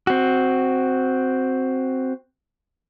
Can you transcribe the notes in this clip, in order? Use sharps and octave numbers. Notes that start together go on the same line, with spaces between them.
C4 F#4